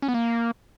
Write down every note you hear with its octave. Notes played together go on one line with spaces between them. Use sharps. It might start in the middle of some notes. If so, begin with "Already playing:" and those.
C#4
B3
A#3